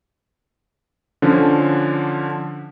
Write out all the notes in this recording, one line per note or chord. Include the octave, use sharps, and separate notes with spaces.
D3 F3 C#4 D4